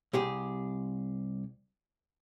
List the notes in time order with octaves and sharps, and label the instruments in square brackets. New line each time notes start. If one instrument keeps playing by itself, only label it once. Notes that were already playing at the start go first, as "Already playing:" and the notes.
[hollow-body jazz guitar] C2 G4 G#4